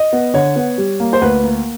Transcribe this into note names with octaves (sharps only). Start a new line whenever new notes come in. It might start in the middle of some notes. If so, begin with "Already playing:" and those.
Already playing: D#5
B3
D3 C#5
B3
G3
A#3
C5
D2 B4
A#3